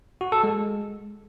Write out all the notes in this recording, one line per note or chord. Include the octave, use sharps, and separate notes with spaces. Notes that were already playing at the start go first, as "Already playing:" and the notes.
F#4
A4
G#3